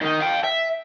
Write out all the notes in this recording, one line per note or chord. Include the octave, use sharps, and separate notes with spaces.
D#3 D#4
F5 G5
E5